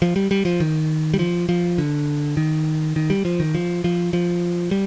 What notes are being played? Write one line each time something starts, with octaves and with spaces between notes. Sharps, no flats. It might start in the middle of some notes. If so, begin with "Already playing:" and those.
F3
G3
G3
F3
D#3
G3
F3
F3
D3
D#3
D#3
G3
F3
D#3
F3
F3
F3
G3